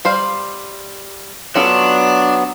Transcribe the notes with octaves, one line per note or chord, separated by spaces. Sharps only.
G3 C5 F5
F#3 B3 C#4 D4 F4 A4